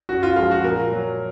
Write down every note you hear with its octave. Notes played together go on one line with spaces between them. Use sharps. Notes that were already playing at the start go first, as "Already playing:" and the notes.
F#2 F#4
F4
F3 G#3 F4
F#4
A#2 A#4
F#3